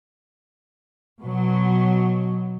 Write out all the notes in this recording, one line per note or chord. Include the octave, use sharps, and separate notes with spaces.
B2 F#3